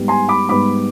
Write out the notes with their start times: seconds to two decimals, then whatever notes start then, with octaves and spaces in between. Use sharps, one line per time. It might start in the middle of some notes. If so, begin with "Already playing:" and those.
Already playing: G#2 G3 B3
0.08 G#5 C6
0.29 B5 D6
0.49 G#2 G3 B3 B5 D6